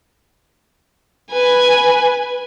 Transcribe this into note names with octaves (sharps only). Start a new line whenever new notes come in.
B4 G#5